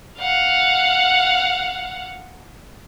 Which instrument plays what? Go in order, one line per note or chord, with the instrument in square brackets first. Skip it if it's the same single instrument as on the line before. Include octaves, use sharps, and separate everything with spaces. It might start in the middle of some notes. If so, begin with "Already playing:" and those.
[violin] F5 F#5